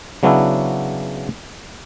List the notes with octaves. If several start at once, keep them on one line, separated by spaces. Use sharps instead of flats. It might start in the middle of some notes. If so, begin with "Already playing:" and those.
C#3 F#3 B3 C#4 D4 E4